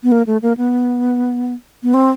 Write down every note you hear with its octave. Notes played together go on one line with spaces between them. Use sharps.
B3
A#3
A3
A#3
B3
B3
C4